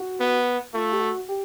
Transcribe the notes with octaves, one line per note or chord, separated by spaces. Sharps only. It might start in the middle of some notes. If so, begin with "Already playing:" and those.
Already playing: F#4
B3
A3 F4
G4
F#4
G4